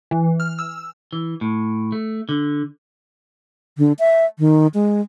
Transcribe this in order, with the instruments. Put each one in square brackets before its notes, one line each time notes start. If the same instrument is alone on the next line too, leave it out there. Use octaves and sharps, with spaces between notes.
[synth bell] E3
F6
E6
[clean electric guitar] E3
A2
A3
D3
[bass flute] D3
E5
D#3
G#3